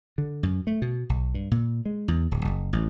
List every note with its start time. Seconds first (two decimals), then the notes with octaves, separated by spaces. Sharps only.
0.18 D3
0.43 F#2
0.67 A3
0.82 B2
1.09 B1
1.34 G2
1.51 A#2
1.86 G#3
2.08 E2
2.31 D1
2.45 F#1
2.73 A1